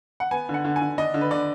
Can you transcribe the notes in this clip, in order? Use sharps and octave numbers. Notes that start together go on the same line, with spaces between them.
F#5
B3 G#5
D3
F#5
D3
G#5
D3
D4 D#5
D3
B4
D3 D5